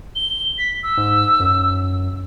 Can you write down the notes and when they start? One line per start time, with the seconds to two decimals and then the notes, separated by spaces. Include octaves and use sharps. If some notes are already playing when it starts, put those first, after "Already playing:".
0.16 G7
0.58 B6
0.83 E6
0.97 G#2
1.40 F#2